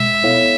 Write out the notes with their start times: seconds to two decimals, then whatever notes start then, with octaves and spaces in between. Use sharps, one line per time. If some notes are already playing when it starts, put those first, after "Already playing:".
Already playing: B2 G#3 E5
0.24 B3 E4 A4 C#5 F5